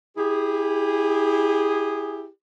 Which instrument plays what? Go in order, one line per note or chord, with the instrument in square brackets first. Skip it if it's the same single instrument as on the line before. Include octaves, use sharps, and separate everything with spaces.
[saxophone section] E4 G4 G#4